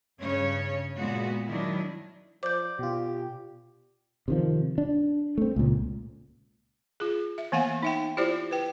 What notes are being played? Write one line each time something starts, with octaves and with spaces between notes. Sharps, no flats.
G2 C#3 C#4 C#5
A#2 G#3 B3 F#4
D#3 F#3 D4 E4
F3 C5 D5 G6
B2 F4 G4
C3 D#3 F3
D4
A3 C4
C#2 A#2
F4 G#4
E5
E3 A#3 B3 F5 F#5 G#5
D#4 E5 G5
E4 F4 G4 C5 D5
B4 G5